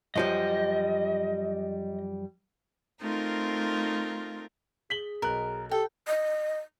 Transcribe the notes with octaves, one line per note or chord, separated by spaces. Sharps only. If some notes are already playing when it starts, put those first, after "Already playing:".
F#2 F3 G3 D#5
A3 C4 D#4 F4 A#4
G#4 B6 F#7 G7
B1 A#4 D#5 F#6
G4 A4 G5
D#5